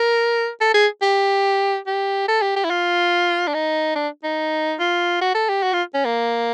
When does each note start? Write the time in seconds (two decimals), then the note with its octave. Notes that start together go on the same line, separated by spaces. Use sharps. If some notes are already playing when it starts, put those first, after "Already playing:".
Already playing: A#4
0.61 A4
0.74 G#4
1.02 G4
1.87 G4
2.28 A4
2.42 G4
2.56 G4
2.65 E4
2.70 F4
3.47 D4
3.54 D#4
3.95 D4
4.24 D#4
4.79 F4
5.21 F#4
5.34 A4
5.49 G4
5.63 F#4
5.73 F4
5.94 C#4
6.05 A#3